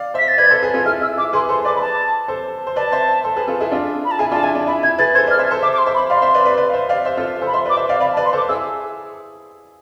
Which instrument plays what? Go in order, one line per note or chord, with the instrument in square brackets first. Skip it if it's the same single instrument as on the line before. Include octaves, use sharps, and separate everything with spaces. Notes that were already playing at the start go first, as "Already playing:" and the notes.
Already playing: [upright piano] D5 F5
[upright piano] C5 E5 [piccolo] B6
[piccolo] A6
[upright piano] B4 D5 [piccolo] G#6
[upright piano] A4 C5
G#4 B4
F4 A4
[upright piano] E4 G#4 [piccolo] F6
[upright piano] E4 [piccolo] E6
[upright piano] E4 [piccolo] D6
[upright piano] G#4 B4 [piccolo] C6
[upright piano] A4 C5 [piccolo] C6
[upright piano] B4 D5 [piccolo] D6
[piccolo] B5
A5
[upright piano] A4 C5
C5
[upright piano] B4 D5 [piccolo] A5
[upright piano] C5 E5
A4 C5
G#4 B4
F4 A4
E4 G#4
D4 F4
[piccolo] B5
A5
[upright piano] E4 G#4 [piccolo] G#5
[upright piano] D4 F4 [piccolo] A5
[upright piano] E4 [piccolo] G#5
[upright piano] D4
[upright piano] E4 [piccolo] B5
[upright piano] E4 [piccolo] G#6
[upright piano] G#4 B4 [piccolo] A6
[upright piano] A4 C5 [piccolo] G#6
[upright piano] B4 D5 [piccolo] F6
[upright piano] C5 E5
A4 C5
[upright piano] C5 E5 [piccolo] D6
[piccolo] D6
C6
[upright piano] C5 E5
[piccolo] B5
[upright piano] D5 F5 [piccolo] C6
[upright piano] C5 E5
B4 D5
B4 D5
B4 D5
F5
C5 E5
D5 F5
C5 E5
F4 A4
A4 C5
[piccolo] B5
[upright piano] C5 E5 [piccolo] C6
[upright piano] B4 D5 [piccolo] D6
[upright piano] C5 E5
D5 F5
[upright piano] D5 F5 [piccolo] B5
[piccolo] A5
[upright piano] B4 D5
[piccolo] C6
[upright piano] A4 C5 [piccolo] D6
[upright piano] E4 G#4 [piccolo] E6